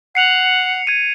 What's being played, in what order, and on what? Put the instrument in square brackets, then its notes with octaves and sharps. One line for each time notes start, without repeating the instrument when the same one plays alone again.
[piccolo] F#5 [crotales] C7 C#7 F7
[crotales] G#6 D#7